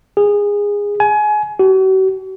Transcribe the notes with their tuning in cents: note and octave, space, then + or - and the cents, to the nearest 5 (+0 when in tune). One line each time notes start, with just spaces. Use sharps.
G#4 -20
G#5 +25
F#4 +45